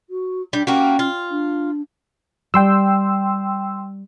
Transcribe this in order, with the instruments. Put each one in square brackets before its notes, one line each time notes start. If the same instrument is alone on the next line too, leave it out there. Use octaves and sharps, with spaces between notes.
[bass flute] F#4
[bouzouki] G3 [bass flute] D4
[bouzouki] G3 A#3 F#4 [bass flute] C#4
[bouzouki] F4
[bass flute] D4
[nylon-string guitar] G3 [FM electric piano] G5 C6 E6